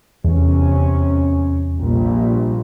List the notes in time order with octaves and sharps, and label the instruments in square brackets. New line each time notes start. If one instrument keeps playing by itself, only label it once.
[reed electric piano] E2 [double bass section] C3 C#4
[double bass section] A#1 A#2 G3